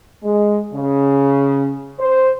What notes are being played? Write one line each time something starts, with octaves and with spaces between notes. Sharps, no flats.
G#3
C#3
C5